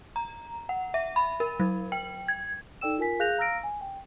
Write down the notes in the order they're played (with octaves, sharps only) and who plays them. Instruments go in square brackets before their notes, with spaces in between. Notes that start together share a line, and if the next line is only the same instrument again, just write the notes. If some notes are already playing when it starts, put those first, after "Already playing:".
[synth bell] A#5
F#5
E5
B5
A#4
F#3
G5
G#6
[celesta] D#4 A4 D5 G5 E6 E7
F4 A#4 G#5 B6
G#4 F5 F#6 G6 A#6 F7
F5 A#5 E6 F6 A#6 D7
G#5
G5